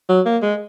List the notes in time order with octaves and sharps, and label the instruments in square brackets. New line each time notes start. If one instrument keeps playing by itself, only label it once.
[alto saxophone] F#3
A#3
G#3